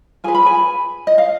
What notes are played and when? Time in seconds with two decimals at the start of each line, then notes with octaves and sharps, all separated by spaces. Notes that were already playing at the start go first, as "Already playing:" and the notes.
0.24 F4 G#4 B4 G#5
0.35 B5
0.46 G#5
1.07 D#5
1.18 F5